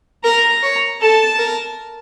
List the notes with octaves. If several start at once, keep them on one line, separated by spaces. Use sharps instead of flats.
A#4 A#5
C#5
A4 A5
A#4